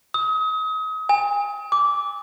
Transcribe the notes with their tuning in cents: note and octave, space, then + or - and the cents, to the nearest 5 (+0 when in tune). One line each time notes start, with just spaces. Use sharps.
D#6 +35
G#5 -30
D6 -15